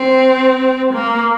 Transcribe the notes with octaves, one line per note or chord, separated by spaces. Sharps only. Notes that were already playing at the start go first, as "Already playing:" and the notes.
Already playing: C4
A#3